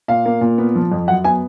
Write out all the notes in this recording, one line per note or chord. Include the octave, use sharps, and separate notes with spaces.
A#2 F5
A#3
A#2
B3
F3
F2
F#2 F#5
B3 G#5